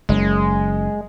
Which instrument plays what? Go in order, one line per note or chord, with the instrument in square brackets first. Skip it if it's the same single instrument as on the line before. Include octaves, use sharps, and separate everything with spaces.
[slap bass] F#1 [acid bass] G#3